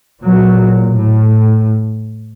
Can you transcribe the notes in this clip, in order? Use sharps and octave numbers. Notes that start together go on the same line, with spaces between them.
A#2 F#3
A2